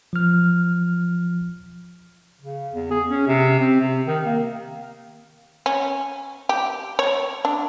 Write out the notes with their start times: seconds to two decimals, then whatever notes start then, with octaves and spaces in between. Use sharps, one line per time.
0.13 F3 F6
2.40 C#3
2.73 E2
2.91 G#4
3.09 C#4
3.27 C3
3.60 C4
3.80 C3
4.07 D#3
4.25 A#3
5.66 C#4
6.49 G4
6.99 C#5
7.45 D4